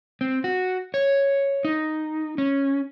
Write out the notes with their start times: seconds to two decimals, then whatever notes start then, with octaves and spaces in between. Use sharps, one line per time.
0.21 C4
0.44 F#4
0.94 C#5
1.65 D#4
2.38 C#4